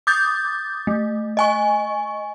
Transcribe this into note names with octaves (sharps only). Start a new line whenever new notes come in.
D6 D#6 G6 A6
A3
D#5 G#5 C#6